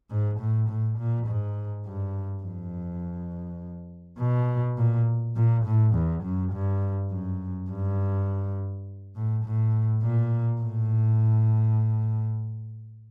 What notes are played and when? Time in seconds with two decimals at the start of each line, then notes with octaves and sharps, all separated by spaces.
0.11 G#2
0.40 A2
0.69 A2
0.98 A#2
1.27 G#2
1.85 G2
2.43 F2
4.19 B2
4.78 A#2
5.36 A#2
5.65 A2
5.95 E2
6.23 F#2
6.52 G2
7.11 F#2
7.70 G2
9.16 A2
9.45 A2
10.03 A#2
10.61 A2